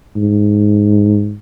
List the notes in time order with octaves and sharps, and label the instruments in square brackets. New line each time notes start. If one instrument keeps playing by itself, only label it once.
[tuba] G#2